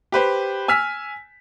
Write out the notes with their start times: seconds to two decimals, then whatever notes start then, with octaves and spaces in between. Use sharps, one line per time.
0.12 G4 B4 C5
0.68 G#5 E6 F6 B6